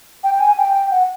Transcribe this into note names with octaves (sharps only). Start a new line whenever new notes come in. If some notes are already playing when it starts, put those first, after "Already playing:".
G5
G5
G#5
G5
G5
F#5